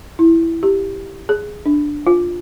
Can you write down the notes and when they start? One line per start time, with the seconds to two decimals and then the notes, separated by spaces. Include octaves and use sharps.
0.19 E4
0.63 G4
1.29 G#4
1.66 D4
2.07 F4